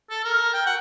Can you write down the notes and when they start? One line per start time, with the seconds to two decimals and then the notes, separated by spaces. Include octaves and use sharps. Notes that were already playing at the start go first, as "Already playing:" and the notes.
0.10 A4
0.25 A#4
0.54 G5
0.66 F#5